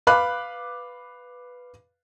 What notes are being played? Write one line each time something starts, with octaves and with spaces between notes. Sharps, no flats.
B4 F5 B5 D6 F#6